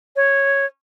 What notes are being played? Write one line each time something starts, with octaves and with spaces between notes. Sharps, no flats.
C#5